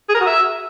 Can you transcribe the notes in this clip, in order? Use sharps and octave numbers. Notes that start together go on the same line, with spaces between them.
G#4
A#4
F#4
E5